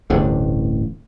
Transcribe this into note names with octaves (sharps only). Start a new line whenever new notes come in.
D1 A1 G2 D3